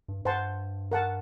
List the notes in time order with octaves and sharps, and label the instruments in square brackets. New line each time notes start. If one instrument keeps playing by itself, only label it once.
[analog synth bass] G2
[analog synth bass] G2 [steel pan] C5 F#5 A5 C6
[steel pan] A#4 F#5 A5